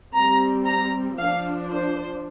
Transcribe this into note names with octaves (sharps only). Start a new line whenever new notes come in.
G3 C4 A#5
A#5
F3 D4 F5
C5